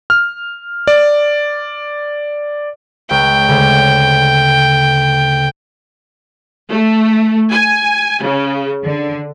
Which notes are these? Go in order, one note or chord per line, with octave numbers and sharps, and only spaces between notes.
F6
D5
C#2 G5
D2 C#3
A3
G#5
C#3
D3